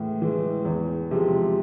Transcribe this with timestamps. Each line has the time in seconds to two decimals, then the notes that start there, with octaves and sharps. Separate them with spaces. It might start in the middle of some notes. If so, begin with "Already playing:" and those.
Already playing: A2 E3 G#3
0.22 E3 G#3
0.65 E2
1.11 C3 F3 G#3